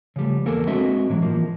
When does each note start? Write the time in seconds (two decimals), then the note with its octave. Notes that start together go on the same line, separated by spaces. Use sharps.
0.16 C#3 F3 G3 A3
0.46 E2 A#3 A4 A#4 G#5
0.67 G#3 C4 D4 F#4 D#5 E5
1.09 A2 E3 F#3
1.22 E3 F3 A#3